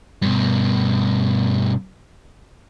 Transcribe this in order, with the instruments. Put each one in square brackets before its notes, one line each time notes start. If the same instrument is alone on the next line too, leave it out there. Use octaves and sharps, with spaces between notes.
[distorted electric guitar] G2 B2